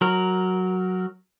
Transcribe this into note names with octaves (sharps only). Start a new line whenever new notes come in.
F#3 A#4